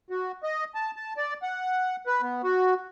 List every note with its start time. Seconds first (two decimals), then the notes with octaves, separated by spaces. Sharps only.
0.10 F#4
0.43 D#5
0.75 A5
0.96 A5
1.17 D5
1.43 F#5
2.07 B4
2.22 B3
2.44 F#4